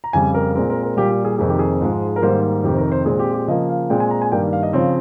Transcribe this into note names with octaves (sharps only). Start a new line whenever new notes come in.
A#5
F2 C#3 G3 G#5
A#4
A#2 G#3 C4 A#4
A#4
A#4
A#2 G3 A#3 G4
G4
G#4
F2 C3 D#3 A#3 G#4
G4
G#4
G#2 F3 G#3
A#4
G#2 D#3 G3 A#3 C5
F2 C3 D#3 G4
C5
A#4
C5
A#2 G#3 C4 G#4
G4
G4
C#3 F3 A#3 D#5
F5
A#2 G#3 C4 G5
G#5
A#5
G#5
G2 D#3 G3 A#3 G5
F5
D#5
C#3 F3 C4 C#5